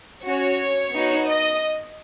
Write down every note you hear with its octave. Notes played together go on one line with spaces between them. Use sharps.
C#4 F#4 C#5
B3 D#4 F#4
D#5